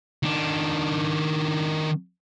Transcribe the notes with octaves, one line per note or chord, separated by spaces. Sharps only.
D#3 D4